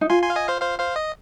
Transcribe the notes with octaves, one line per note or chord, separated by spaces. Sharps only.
D#4
F4 G#5 C6
G#5 C6
F5
D#5 G#5
C5 F5
C5 F5
C5 F5
D#5